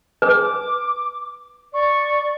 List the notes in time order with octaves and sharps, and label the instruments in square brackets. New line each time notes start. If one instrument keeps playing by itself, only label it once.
[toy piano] B4 [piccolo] D6
[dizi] D5 [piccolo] C#6